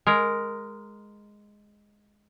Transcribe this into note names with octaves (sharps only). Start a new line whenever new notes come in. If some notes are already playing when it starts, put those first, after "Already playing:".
G#3 A#4